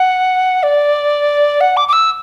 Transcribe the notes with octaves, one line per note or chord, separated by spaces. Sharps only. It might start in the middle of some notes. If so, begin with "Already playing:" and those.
Already playing: F#5
D5
F#5
D6
D6
E6